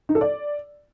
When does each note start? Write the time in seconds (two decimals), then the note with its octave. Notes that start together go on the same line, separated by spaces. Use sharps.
0.09 D#4
0.15 A4
0.21 D5